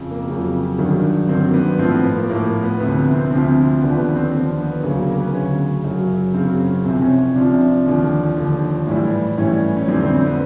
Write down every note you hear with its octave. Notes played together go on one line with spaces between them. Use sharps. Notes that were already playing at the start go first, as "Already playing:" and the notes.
Already playing: F2 C#3
A#3
F2 C#3 F#3
G2 D#3 F#3
G2 D#3 F#3 C4
A#3
B3
A2 F3 C4
B3
B3
A#3
A2 F3 A#3
B3
D2 C3 F3 B3
B3
C4
D2 C3 F3 C4
D#2 D3 F3 B3
B3
C4
D#2 D3 F3
B3
D2 C#3 F#3 A#3
B3
A#3
B3
D2 C#3 F#3 C#4
F#2 C#3 F#3
F#2 C#3 F#3 C4
C#4
C2 C3 F3 C4
C#4
C#4
C2 C3 F3 D4
D#2 D3 F3
D#2 D3 F3
A2 E3 G3
A2 E3 G3 C#4
C#4
F2 D3 G3 C4
C4
C4
B3